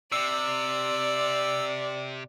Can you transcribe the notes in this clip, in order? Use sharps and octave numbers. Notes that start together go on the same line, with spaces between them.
C3 D5 E6